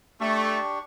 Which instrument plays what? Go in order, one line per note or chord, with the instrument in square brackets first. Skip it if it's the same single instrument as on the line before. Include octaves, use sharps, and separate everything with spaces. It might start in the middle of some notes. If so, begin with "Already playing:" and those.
[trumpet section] A3 [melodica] D4 G4 C#6